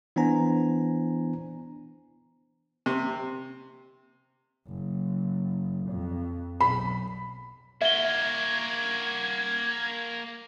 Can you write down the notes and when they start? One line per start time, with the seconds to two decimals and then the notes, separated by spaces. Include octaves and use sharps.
0.16 E3 B3 D4 C5 G#5 A#5
2.86 C3
4.68 F#1
5.91 F2
6.61 B1 B5
7.82 A#3 F#4 E5 G#6 G7